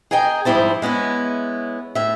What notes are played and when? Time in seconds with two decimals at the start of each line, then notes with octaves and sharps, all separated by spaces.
0.11 G#4 A#4 D#5 G5 G#5
0.45 G#2 F3 G3 E4 C5 A5
0.82 G#3 B3 C#4 E4
1.95 A2 E5